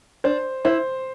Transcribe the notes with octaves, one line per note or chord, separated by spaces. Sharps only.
D4 C5
E4 C5